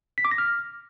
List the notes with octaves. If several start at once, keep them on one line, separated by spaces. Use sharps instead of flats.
B6
D6
A#6
F6